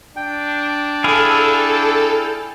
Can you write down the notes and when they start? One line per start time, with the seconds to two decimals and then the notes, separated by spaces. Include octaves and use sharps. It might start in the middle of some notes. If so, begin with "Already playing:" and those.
0.16 D4 G5
1.04 E4 G#4 A4 F5